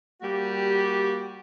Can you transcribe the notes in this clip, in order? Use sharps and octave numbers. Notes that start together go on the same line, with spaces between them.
G3 A#3 F#4 G4